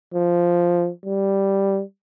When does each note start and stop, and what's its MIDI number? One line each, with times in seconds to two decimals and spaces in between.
0.15 0.89 53
1.06 1.82 55